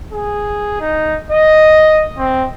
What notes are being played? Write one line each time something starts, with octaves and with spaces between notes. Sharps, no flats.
G#4
D#4
D#5
C4